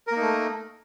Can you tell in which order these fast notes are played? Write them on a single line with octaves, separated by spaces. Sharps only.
A#4 A#3 D#4 A3